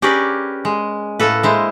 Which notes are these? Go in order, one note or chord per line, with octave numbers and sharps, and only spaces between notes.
C#4 G4 G#4 A#4 B4 D5
G#3
A2 A#3 A4 B4
G#3 E4 C5